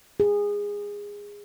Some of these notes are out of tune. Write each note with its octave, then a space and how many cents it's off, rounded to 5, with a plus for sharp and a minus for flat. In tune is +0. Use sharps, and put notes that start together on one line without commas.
G#4 -20